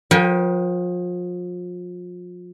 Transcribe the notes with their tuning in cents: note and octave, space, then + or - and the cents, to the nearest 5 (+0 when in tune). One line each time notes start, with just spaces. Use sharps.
F3 +35 B4 -40 G5 +0